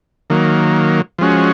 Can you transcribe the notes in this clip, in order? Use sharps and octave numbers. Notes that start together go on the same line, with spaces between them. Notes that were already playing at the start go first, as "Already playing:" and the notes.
D#3 F#3 A#3
F3 G#3 C#4 F#4